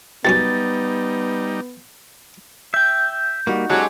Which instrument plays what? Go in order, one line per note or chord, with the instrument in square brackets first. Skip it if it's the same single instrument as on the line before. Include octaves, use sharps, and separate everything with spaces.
[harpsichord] C2 F#2 C#4 [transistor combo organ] G3 D#4 [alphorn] B3 [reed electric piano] A6
[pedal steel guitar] E5 G5 [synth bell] G6
[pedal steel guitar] G3 A#3 [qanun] D#4 F#4
[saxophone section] F#3 [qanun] G#3 G4 [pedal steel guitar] C#4 A4 D5